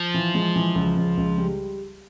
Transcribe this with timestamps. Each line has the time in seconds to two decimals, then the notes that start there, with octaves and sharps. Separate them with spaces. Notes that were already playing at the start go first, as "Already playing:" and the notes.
Already playing: F3
0.14 E3
0.35 G#3
0.56 E3
0.75 C#2
0.96 C#2
1.17 C#2
1.38 G3